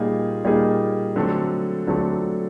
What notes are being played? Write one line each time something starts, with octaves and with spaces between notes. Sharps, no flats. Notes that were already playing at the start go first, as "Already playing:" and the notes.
Already playing: A#2 G3 A#3 D#4 G#4
A#2 G3 A#3 D#4 G#4
D3 F#3 A3 C4
D3 F#3 A3 C4